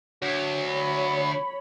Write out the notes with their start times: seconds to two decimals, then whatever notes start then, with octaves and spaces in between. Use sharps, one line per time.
0.22 D2 F#3
0.67 C#5 B5